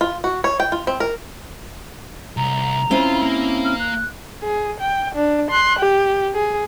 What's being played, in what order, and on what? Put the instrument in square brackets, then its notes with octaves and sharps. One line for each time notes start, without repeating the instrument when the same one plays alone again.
[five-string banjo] F4
F#4
C#5
G5
F4
C4
A#4
[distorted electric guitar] C2 [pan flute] A#5
[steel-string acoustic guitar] C4 C#4 E4 [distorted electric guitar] F4
[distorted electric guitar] A#3
[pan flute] F6
F#6
[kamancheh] G#4
G5
D4
C6 F#6
G4
G#4